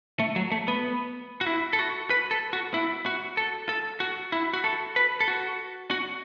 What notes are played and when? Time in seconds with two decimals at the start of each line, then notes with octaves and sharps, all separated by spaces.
0.20 A3
0.36 F#3
0.52 A3
0.68 B3
1.41 F#4
1.46 E4
1.73 A4
1.79 F#4
2.10 B4
2.31 A4
2.53 F#4
2.74 E4
3.06 F#4
3.37 A4
3.69 A4
4.00 F#4
4.32 E4
4.54 F#4
4.64 A4
4.96 B4
5.20 A4
5.28 F#4
5.91 F#4